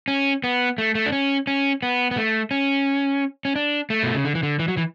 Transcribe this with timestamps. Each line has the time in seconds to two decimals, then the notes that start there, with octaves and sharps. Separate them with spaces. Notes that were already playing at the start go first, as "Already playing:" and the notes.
0.08 C#4
0.44 B3
0.78 A3
0.95 A3
1.06 D4
1.12 C#4
1.47 C#4
1.83 B3
2.11 B3
2.17 A3
2.51 C#4
3.45 C#4
3.56 D4
3.90 A3
4.03 B2
4.14 C#3
4.25 D3
4.35 E3
4.43 D3
4.59 E3
4.68 F#3
4.77 E3